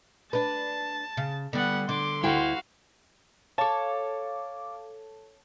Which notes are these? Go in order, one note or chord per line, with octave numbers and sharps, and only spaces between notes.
D4 B4 A5
C#3
D3 G3 B3 F#5
D3 C6 D6
D2 E4 F#4 F5 G5
A4 C#5 F5 A5 D6